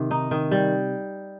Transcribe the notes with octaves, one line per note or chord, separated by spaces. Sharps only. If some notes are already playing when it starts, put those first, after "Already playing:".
Already playing: C3 D#3
D#4
D#3
G3